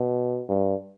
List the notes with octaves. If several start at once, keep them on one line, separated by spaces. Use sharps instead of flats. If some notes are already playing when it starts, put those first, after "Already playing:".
Already playing: B2
G2